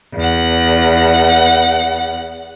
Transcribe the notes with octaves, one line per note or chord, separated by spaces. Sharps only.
E2 F#5